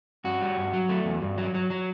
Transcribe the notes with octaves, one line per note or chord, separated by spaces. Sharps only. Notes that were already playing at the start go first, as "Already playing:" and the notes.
G2 F#4
G3
G2
F#3
A3
E2
G2
F#3
F#3
F#3